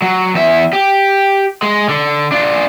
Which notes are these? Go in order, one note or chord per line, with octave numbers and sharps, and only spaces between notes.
F#3
E2 E5
G4
G#3
D3
D4 F4